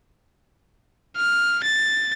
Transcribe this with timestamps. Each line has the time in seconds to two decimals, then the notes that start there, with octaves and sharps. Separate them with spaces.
1.16 F6
1.63 A6